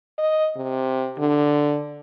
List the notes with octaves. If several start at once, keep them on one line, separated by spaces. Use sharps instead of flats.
D#5
C3
D3